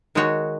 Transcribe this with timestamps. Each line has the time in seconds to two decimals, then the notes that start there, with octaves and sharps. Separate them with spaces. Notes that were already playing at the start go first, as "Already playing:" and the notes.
0.15 D#3 G#3 D#4 F#4 C#5